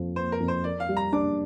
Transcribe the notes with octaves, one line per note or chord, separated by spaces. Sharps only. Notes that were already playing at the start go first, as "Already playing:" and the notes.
Already playing: F2 F3 A#3
A#3 C5
A#4
F2
C5
A#4 D5
F5
G3
A#5
D4 D6